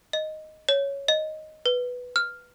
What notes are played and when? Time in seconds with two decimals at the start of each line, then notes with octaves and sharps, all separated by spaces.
0.13 D#5
0.69 C#5
1.08 D#5
1.66 B4
2.16 F6